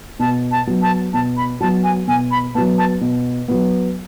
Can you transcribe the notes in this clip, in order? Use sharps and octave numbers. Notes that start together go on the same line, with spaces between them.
B2 A5
A5
F#3 B3
A5
B2 A5
B5
F#3 B3 A5
G#5
B2 G#5
B5
F#3 B3 A5
A5
B2
F#3 B3